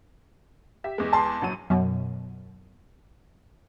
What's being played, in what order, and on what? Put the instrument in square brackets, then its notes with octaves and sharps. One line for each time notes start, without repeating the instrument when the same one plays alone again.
[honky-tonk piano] G4 E5 B6
E2 G#3
[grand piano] A5 C6
[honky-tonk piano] A#1 F#3 D#7
[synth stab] F#2 B2